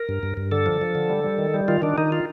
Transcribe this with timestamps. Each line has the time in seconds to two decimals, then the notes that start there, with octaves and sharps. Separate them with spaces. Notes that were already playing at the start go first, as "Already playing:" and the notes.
Already playing: A#4
0.09 G2
0.23 G2
0.37 G2
0.52 D3 A4
0.66 F3
0.81 F3
0.95 D3
1.09 G3
1.24 G3
1.38 D#3
1.54 G3
1.68 D#3 F4
1.82 D#3 D4
1.98 D#3 D#4
2.12 F4